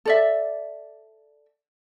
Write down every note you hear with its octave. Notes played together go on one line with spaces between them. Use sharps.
A4 D5 E5